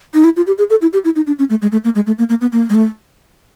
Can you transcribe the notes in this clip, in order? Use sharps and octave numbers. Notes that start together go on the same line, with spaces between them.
D#4
E4
F4
G4
G#4
A4
E4
G4
E4
D#4
D4
C#4
A3
G#3
A3
A#3
G#3
A3
A#3
A#3
B3
A#3
G#3
A3